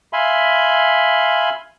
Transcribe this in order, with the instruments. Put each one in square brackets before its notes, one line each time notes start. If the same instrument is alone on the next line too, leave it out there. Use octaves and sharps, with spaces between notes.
[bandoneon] E5 F5 G#5 B5 C6